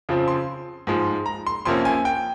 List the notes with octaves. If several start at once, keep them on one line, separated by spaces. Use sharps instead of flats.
F2 C#3 F3 C4
C6
G#2 F3 G#3
A#5
C6
F2 C3 F3 A#3 C#4 C6
G#5
G5